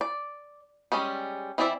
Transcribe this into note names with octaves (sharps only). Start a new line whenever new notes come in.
D5
G3 G#3 C#4
E3 C4 E4 D5 E5